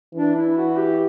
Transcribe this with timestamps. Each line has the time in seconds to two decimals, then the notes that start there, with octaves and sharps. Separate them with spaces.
0.14 E3 D4
0.36 E4
0.57 F#4
0.77 G4